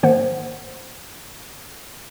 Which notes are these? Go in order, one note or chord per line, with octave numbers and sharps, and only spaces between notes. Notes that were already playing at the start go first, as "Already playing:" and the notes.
G#2 D#3 A#3 C5 F#5